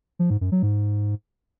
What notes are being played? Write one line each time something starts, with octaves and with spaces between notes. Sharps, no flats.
F3
G#2
F#2
F#3
G#2